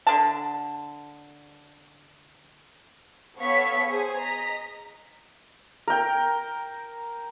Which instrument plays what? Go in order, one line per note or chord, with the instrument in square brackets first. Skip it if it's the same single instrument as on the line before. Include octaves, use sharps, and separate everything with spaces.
[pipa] D3 A5
[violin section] B3 A4 C#5 F5 C#6 B6
G#4 C5 G#5
D#5 A#5 B6
[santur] A#4 G5